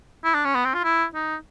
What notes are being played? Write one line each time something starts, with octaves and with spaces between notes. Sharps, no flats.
E4
D4
C#4
B3
C4
F4
E4
D#4